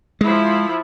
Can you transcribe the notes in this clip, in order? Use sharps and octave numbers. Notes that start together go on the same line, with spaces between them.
F3 G#3 E4